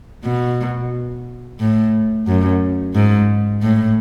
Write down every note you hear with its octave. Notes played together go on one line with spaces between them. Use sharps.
B2
A2
F#2
G#2
A2